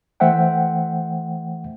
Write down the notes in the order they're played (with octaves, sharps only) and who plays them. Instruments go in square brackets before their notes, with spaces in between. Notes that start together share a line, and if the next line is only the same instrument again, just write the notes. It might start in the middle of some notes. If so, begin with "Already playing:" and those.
[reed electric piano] E3 A3 C5 E5 F#5 G5